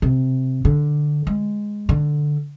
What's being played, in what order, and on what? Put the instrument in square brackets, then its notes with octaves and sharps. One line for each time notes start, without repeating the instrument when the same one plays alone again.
[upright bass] C3
D3
G#3
D3